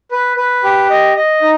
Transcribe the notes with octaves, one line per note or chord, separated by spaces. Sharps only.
B4
B4
G4
D#5
D#5
D#4